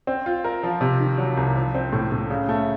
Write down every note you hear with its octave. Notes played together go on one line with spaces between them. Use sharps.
C4
F4
A#4
F3
C3
D#3
F#3
C2
F3
C4
A2
A2
C#3
A3